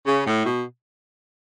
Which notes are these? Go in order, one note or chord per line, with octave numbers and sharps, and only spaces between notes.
C#3
A2
B2